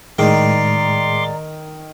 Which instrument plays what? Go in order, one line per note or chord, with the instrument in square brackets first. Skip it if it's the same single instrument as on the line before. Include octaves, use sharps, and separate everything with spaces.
[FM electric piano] A2 G#3 [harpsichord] D#3 [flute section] D5 A#5 [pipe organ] C6 D6